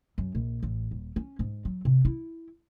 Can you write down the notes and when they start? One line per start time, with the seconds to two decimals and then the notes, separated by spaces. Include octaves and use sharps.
0.18 F#2
0.35 A#1
0.63 A1
0.91 D#1
1.16 C#4
1.39 G#2
1.65 F#3
1.85 C3
2.05 E4